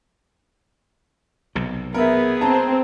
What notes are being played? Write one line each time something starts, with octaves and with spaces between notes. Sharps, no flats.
B1 C3
B3 G#4 A#4 E5
C4 A5 A#5